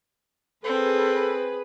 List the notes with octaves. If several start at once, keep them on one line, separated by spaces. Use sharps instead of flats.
C4 G#4 A4 B4